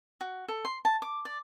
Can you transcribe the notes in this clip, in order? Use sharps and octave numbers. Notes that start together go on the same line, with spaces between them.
F#4
A4
C6
A5
D6
D5